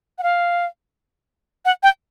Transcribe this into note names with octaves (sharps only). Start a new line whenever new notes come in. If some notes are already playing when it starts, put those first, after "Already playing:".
F#5
F5
F#5
G5